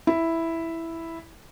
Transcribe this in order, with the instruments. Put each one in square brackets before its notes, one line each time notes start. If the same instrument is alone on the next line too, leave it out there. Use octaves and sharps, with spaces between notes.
[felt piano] E4